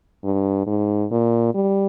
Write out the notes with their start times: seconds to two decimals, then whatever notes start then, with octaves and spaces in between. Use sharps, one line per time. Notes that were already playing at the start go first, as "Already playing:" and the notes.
0.24 G2
0.67 G#2
1.11 A#2
1.55 G3